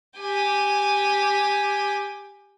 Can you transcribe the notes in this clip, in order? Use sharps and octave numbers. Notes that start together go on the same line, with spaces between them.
G4 G#5